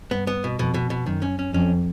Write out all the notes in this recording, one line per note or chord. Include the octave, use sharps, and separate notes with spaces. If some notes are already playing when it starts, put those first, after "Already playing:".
G2 B3
B3
B2
F2 B2
B2
B2
F#2 D#3
C#4
C#4
F2 C#4